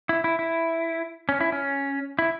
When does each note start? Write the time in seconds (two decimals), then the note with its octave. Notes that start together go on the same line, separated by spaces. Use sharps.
0.09 E4
0.24 E4
0.39 E4
1.29 C#4
1.40 E4
1.52 C#4
2.19 E4